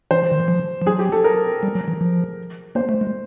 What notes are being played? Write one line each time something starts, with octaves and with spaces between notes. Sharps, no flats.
E3 C5
D#3
E3
F3
F3
F#3 G#4
G4
A4
A#4
G3
F#3
E3
F3
A#3 C5
A3
G#3